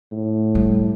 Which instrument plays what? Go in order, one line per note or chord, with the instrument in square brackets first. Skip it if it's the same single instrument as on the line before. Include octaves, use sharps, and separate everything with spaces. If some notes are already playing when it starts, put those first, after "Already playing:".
[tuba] A2
[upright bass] G3